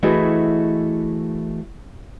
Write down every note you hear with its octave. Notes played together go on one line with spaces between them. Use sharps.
E3 A3 E4 F#4 G#4 D#5